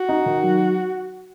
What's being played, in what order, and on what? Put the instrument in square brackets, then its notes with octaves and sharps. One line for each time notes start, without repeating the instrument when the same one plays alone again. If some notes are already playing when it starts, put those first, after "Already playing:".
Already playing: [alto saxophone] F#4
[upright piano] D#4
D#3
F#3